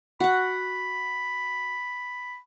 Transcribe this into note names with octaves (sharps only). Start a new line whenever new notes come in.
F#4 F#5 B5